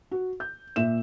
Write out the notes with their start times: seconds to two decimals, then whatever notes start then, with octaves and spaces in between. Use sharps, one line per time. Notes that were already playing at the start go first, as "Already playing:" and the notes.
0.11 F#4
0.40 G6
0.76 A#2 E5 E7